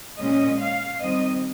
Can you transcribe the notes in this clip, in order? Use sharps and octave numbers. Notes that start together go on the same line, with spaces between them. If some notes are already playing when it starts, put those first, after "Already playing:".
A#2 G#3 C#4 D#5
F5
D#3 G3 C4 D#5